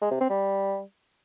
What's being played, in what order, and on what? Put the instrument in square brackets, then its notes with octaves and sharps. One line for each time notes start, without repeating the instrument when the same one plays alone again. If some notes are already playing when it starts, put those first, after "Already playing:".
[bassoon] G#3
C3
C4
G3